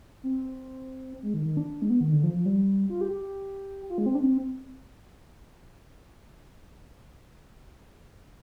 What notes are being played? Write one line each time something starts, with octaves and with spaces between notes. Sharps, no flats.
C4
G#3
D#3
D#3
D4
G#3
B3
D#3
D3
F3
F3
G3
F4
G4
G4
F4
G#3
C4
D4
C4